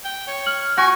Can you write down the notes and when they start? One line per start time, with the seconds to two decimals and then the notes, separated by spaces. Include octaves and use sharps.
0.04 G5
0.27 C#5
0.46 F6 F#7
0.77 F#4 G#5 C#6